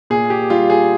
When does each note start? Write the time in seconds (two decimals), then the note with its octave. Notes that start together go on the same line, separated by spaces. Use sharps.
0.10 A#2 G#4
0.30 G4
0.50 G3 F4
0.70 G#4